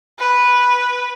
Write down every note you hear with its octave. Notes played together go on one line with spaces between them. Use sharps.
B4